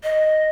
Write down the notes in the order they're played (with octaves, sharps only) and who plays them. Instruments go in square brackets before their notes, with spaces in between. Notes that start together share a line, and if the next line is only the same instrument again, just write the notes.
[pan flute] D#5